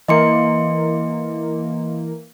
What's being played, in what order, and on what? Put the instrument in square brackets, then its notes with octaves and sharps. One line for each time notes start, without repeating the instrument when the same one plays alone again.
[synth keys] E3 A#3 [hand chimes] D#5 C6 C#7